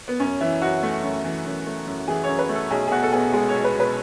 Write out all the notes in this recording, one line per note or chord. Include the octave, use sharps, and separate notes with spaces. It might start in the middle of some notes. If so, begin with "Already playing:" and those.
B3
F#2 C#4
E3 E4
F#2 F#4
A3
F#2
E3
F#2
A3
F#2
E3 G#4
C#5
F#2
B4
A3
A4
B1 G#4
G#4
B2 F#4
A4
B3 G#4
G#3 G#4
C#5
B1
B4
B2
B4